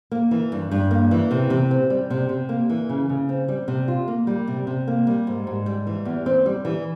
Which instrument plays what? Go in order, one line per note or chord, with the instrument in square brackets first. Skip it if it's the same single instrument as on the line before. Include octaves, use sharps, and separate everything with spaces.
[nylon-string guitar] A#3
E3
G2
G2
A#3
E3
C3
C3
C4
G3
C3
C3
A#3
E3
C#3
C#3
C4
G3
C3
F4
A#3
G3
C3
C3
A#3
G3
G#2
G#2
G3
E3
E2
C4
G3
E3